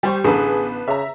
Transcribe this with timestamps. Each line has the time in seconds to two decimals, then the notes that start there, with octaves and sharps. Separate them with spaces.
0.03 G3 G4 C5 C#6
0.24 A1 D3 B3 G#4 A4 B4
0.88 C#3 E5 A#5